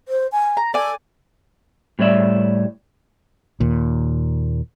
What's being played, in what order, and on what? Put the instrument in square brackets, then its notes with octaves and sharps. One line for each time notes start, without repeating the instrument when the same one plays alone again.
[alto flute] C5
G#5
[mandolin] A#5
[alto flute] A4 [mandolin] D5 G#5
[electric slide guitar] A2 G3 C#5 D5 E5
[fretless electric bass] D#2 A#2